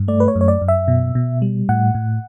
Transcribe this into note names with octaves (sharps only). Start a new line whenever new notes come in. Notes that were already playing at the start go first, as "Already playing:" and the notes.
Already playing: G2
A3 D5
B4
C#5
F#2
C#5
D5
F#2
E5
B2
B2
G3
A2 F#5
A2